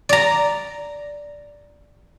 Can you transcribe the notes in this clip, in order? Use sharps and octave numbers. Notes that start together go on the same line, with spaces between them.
D5 A#5